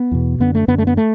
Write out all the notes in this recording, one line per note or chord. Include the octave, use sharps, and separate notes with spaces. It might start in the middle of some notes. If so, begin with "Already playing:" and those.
Already playing: B3
E2 B2
F#2 D3 B3
A3
F#2 D3 B3
A3
B3
A3